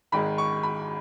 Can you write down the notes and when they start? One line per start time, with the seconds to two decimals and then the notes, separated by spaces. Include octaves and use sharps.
0.12 G#1 G#2 D#3 G#3 B5
0.38 C#6
0.63 B5